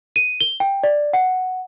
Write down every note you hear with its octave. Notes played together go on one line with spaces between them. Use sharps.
D#7
G7
G5
D5
F#5